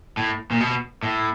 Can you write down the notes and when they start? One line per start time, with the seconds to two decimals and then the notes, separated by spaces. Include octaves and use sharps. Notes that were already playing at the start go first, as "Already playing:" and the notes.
0.17 A2
0.51 A#2
0.60 B2
1.03 A2